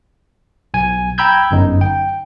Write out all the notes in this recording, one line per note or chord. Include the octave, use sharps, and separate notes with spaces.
B1 G#5
G5 A#5 B5 E6 G6 G#6
G1 F#2 D#4
G5